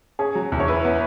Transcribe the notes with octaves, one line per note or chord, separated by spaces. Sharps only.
C#4 G#4
F#3
E2
C#5
E4 B4
B3